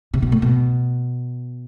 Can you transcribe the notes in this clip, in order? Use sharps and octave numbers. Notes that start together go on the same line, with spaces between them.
C3
B2
A2
B2